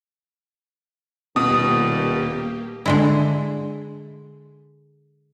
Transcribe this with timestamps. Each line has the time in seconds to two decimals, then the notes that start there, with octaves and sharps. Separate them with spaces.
1.36 D#1 B2 A#3 G4 D#6
2.86 D3 G#3 E4